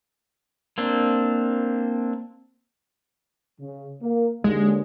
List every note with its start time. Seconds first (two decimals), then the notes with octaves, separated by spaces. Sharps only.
0.78 A#3 C4 D4
3.61 C#3
4.02 A#3
4.44 D#2 D3 G#3